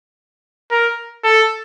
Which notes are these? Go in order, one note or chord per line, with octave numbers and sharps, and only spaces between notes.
A#4
A4